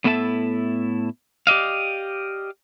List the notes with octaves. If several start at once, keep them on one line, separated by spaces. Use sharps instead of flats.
A2 B3 E4 A4 E5 A5
G4 D5 D#5 F5